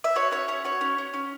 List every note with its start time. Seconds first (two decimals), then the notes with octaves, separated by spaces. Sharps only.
0.04 E5
0.16 F#4 C#5
0.31 C#4 C#5
0.48 C#4 C#5
0.64 F#4 C#5
0.81 C#4
0.98 C#4
1.14 C#4